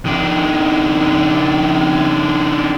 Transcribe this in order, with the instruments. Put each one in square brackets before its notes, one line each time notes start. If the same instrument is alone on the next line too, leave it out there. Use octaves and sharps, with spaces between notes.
[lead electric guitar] D#3 D4